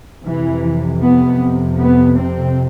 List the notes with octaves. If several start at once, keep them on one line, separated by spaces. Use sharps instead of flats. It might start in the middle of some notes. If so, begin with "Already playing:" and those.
F2 C3 E3
B3
B3
C4